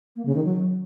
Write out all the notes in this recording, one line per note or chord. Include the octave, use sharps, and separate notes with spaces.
A#3
C#3
D#3
F#3